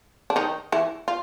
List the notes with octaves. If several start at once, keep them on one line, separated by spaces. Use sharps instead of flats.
D4
D#3 D#4
E3 E4
F4